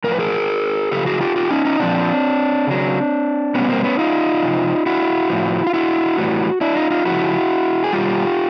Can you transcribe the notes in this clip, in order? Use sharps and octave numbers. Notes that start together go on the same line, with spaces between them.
A2 F3 A#4 B4
G#4 A#4
C#3 F3 G4 A4
F#4 G#4
F4 G4
F4 G4
C#4 D#4
C#4 D#4
A#2 F3 C4 D4
C#3 F#3
B2 G3 B3 C#4
A#3 C4
B3 C#4
D#4 F4
C3 F3
E4 F#4
A2 F3
F4
E4 F#4
A2 E3 G3
D4 E4
D#4 F4
D#4 F4
C#3 F3 E4 F#4
G#4
B2 G3 F4 G4